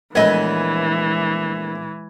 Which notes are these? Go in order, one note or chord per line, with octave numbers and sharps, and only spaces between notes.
A#1 E3 G#3 A3 B3 D#5 G#5 G#6